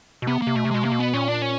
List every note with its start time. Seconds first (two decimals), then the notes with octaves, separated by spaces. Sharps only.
0.22 B2
0.27 C3 B3
0.42 C3 A#3
0.55 B2 A3
0.65 C3
0.71 B2 G#3
0.83 C3 A#3
0.92 B2
0.99 B3
1.14 A#2 C#4
1.28 D4
1.42 C#4